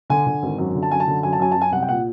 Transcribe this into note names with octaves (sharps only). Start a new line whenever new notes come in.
D3 G#5
D3
G#1
F#2
D3
A5
F#2 G#5
A5
D3
F#2 G#5
A5
F#2 G#5
F#2 A5
G#5
C2 F#5
G5
A#2 F#5